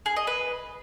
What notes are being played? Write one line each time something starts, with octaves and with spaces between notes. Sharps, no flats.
G#4
D#5
B4